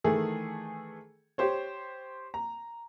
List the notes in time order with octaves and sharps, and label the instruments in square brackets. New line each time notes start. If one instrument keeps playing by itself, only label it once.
[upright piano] D#3 E3 A3 G#4 A4
G4 C5 C#5
A#5